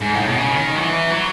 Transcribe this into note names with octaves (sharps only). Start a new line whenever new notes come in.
G#2
A2
B2
C#3
D#3
F#3
E3
F#3